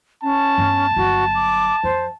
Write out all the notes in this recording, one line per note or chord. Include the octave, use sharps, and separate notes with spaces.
C#4 A5
G2 B3
G1 F#3 F#4
D6
F2 C5